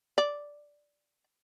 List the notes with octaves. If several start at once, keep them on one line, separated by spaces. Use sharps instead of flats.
D5